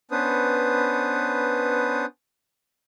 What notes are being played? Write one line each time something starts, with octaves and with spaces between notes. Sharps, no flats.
B3 C#4 D4 B4 C5 D#6